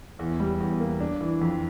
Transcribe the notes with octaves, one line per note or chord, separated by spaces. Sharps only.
E2
G3
E2
A#3
D4
E3
F2